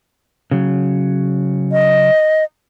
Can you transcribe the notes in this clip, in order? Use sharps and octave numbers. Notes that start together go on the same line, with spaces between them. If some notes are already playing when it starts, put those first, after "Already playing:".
C#3 F#3
D#5